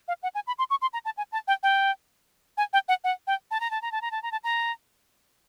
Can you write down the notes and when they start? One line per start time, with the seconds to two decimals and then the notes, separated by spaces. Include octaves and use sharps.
0.08 F5
0.23 F#5
0.35 G#5
0.47 B5
0.59 C6
0.70 C#6
0.82 C6
0.93 A#5
1.05 A5
1.17 G#5
1.32 A5
1.48 G5
1.63 G5
2.57 G#5
2.73 G5
2.88 F#5
3.04 F#5
3.27 G5
3.51 A5
3.60 A#5
3.71 A5
3.82 A#5
3.92 A5
4.02 A#5
4.11 A5
4.23 A#5
4.32 A5
4.44 A#5